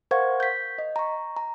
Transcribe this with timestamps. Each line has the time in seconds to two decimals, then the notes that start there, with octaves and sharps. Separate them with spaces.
0.11 A#4 C5 F5 F#5 C#6 G#6
0.40 G6 B6
0.78 D#5
0.96 A#5 C#6
1.36 A#5